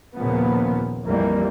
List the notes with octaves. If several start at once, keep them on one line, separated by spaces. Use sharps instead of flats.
D#2 A#2 C#3 F3 A#3 B3
A#1 F2 E3 G3 A#3